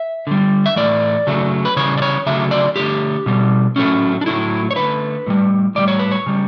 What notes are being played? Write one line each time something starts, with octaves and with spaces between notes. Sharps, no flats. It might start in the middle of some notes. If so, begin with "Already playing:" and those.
Already playing: E5
D3 G3
E5
A2 E3 A3 D5
C#3 F#3 A3
B4
C#3 E3 G3 C#5
D5
C#5
C#3 F#3 A3 E5
D5
D3 A3 G4
B2 G3
A2 F#3 A3 C#4
D4
A2 F#3 A3 E4
C#5
D3 A3 B4
A2 E3 G3
A2 E3 G3 D5
C#5
B4
C#5
C#3 G3